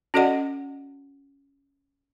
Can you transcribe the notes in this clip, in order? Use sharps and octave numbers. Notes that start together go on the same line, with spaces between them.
C#4 F#4 A4 D5 D#5 F#5